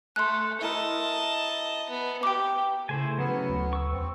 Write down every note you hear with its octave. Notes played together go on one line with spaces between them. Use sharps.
A3 C6 F#6
E4 A#4 D#5 A5
B3
G4 G5 D6
C#3 A3 E4 C5 G#5
F#3 A3 B3 C#4
D2
C#6 E6
E2 C4